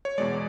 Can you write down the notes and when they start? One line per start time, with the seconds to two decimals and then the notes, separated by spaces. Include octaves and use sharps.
0.05 C#5
0.18 E2 B2 G#3 D5